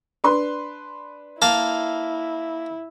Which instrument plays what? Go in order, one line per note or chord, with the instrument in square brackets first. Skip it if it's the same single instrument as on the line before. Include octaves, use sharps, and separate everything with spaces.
[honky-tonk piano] D4 B4 C6
[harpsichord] A#3 F5 A5 [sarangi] E4